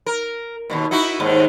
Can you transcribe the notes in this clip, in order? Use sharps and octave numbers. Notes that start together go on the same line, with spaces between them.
A#4
D#2 G#2 B2
D#4 E4 F#4
D#2 G#2 D#3